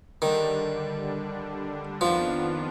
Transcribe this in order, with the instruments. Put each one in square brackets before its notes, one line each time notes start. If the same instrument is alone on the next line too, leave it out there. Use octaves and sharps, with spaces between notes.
[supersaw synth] D3 G3 D4 [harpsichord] D#3
[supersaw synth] F2 D#3 B3 D4 F4 [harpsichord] F3